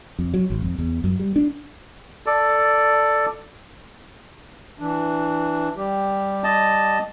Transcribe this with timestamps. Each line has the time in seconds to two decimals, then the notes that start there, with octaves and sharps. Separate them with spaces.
0.19 F2
0.34 F#3
0.50 G#1
0.62 F2
0.79 E2
1.04 F#2
1.20 G3
1.36 D4
2.26 A4 D5
4.79 E3 D4
5.76 G3 G4
6.44 D#5 A5